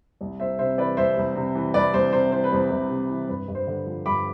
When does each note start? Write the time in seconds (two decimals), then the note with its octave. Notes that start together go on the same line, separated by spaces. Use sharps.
0.21 C2
0.40 C2 C5 E5
0.59 C3 C5 E5
0.78 E3 B4 D5
0.97 C2 C5 E5
1.17 C2
1.36 C3
1.55 E3
1.74 C2 B4 D5
1.94 C2 C5
2.13 C3 C5
2.32 E3 C5
2.44 B4
2.52 C2 C5
2.71 C2
2.90 C3
3.09 E3
3.29 G2 B4
3.48 G2
3.55 C5
3.67 D3
3.86 F3
4.06 G2 B5 D6